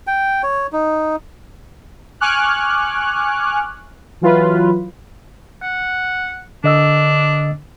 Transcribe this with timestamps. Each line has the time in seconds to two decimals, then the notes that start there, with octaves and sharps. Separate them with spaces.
0.07 G5
0.43 C#5
0.73 D#4
2.20 G#5 C#6 D6 F6 F#6
4.21 E3 F#3 F4 B4
5.63 F#5
6.64 D3 D4 D#5 E6